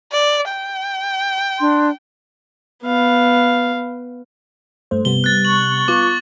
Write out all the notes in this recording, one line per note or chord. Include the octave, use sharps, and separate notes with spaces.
D5
G5
D4 C6
B3 F5
G2 A3 C5
C3 G3 B3 G7
F#6 A6
C#6 F#7
B3 F4 D6